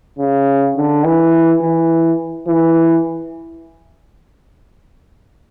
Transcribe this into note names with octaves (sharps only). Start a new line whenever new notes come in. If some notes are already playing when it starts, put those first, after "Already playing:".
C#3
D3
E3
E3
E3